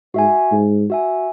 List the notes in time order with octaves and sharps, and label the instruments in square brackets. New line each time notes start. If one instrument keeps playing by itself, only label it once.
[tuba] G#2 [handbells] F#4 E5 G#5
[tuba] G#2
[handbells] F#4 E5 G#5